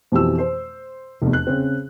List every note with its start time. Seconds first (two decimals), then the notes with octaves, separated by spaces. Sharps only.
0.12 F2 B2 E3 G4 E6
0.38 C5
1.22 F1 E2
1.33 F#6
1.47 C#3 C4